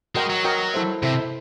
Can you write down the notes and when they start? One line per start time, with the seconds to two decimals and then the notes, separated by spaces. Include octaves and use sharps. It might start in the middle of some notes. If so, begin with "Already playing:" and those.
0.15 G#3 F#4 A#4 D#5 G5
0.30 F#3
0.45 F#4 A#4 D#5 G5
0.74 E4 A4 C5 E5
1.03 C3 E4 A4 C5 E5